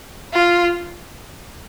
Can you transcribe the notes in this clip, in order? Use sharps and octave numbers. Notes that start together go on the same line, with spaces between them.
F4